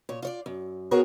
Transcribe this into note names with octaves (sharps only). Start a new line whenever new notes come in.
A#2 C#5
F4 C#5 D5
F#2
B3 F#4 G#4 A#4 C#5